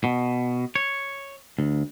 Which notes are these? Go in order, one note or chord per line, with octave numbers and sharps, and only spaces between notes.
B2
C#5
D2